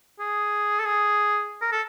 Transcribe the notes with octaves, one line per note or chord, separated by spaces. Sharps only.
G#4
A4
G#4
A#4
A4